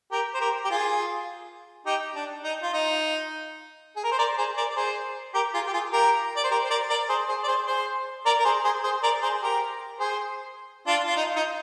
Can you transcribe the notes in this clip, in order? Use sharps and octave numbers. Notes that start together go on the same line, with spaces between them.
G4 A#4
C5
G4 A#4
G4
F4 G#4
D#4 G4
D4
D#4
F4
D#4
G#4
A#4
C5
A#4 D5
G#4 C5
A#4 D5
D5
G#4 C5
G4 A#4
F4 G#4
G4
F4 G#4
G4 A#4
D5
C5
G4 A#4
C5
A#4 D5
A#4 D5
G#4 C5
G#4 C5
D5
G#4 C5
G#4 C5
A#4 D5
A#4
G#4 C5
G#4 C5
G#4 C5
A#4 D5
G#4 C5
G#4
G4 A#4
G#4 C5
D4 F4
F4
D#4
D#4